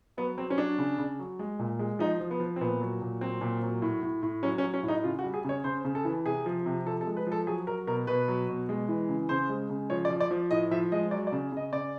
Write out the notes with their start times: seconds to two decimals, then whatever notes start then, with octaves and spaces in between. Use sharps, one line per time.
0.17 F#3 B3
0.37 F#3 C4
0.50 C#4
0.58 F#3 D4
0.78 C#3
0.98 C#3
1.19 F#3
1.39 G#3
1.59 A#2
1.79 G#3
1.99 F3 D#4
2.20 F3
2.31 B3
2.40 F3
2.56 C4
2.61 A#2 B3
2.81 F#3
3.02 A#2
3.21 F#3 C4
3.41 A#2
3.62 F#3
3.82 A2
4.03 A2
4.23 A2
4.43 F#3 C#4
4.58 C#4
4.63 F#3
4.74 C#4
4.83 A2
4.88 D#4
5.04 C#3 F4
5.19 F#4
5.24 G3
5.34 G#4
5.45 C#3 C#5
5.64 C#3 C5
5.85 C#3
5.95 A4
6.05 E3
6.25 C3 G#4
6.46 F3
6.66 C3
6.86 F3 A4
7.01 A4
7.07 G#3
7.17 B4
7.27 F3
7.32 A4
7.47 F#3 G#4
7.67 F#3 A#4
7.87 B2 A#4
8.07 B2 B4
8.28 F#3
8.49 B2
8.69 G#3
8.89 E3
9.09 C#3
9.29 C#3 C5
9.49 G#3
9.70 C#3
9.90 F3 C#5
10.05 D5
10.10 F3
10.20 D5
10.31 F3
10.51 A2 D#5
10.71 F3 E5
10.92 G#3 D#5
11.11 F#3 D5
11.27 D5
11.32 C#3
11.52 C#3 D#5
11.73 C#3 D5